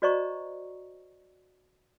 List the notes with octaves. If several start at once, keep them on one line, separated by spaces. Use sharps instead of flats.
F#4 C5 D5 D#5 A#5 C#6